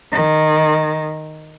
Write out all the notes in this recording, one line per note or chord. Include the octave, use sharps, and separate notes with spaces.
D#3